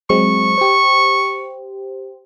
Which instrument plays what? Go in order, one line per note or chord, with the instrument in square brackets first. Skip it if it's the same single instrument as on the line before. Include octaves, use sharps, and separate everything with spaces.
[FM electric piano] F#3 G#3 C4 [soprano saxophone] C#6
[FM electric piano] G4 C5